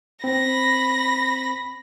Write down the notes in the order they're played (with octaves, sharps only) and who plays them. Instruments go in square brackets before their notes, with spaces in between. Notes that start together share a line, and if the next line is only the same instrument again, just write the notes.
[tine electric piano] C4 [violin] B5 A#6